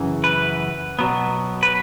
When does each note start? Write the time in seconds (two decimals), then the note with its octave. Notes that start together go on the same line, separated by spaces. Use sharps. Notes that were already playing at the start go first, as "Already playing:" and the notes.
Already playing: F#2 C#3 E3
0.24 B4
0.99 B2 F#3 B3
1.63 B4